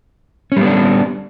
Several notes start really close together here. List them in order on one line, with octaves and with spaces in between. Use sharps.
C#4 G3 B3 D4